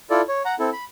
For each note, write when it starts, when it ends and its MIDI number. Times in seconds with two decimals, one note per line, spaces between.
0.10 0.21 64
0.10 0.21 65
0.10 0.21 69
0.10 0.21 74
0.28 0.42 73
0.45 0.55 78
0.45 0.55 82
0.59 0.70 60
0.59 0.70 64
0.59 0.70 69
0.73 0.85 83